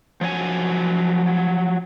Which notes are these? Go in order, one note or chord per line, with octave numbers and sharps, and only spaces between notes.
F3 F#3 C#5 G#5